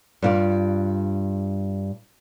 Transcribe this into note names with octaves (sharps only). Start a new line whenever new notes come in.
G2 F4 D5